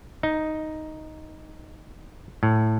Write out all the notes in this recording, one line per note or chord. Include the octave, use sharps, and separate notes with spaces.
D#4
A2